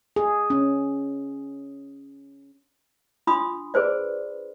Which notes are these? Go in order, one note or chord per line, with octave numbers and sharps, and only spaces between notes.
G#4
C#4
D4 F4 B5 C6 D#6
G#4 B4 C5 D5